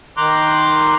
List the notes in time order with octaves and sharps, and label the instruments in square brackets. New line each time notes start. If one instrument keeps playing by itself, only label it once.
[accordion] D#3 A#5 C6 D6 F#6 G6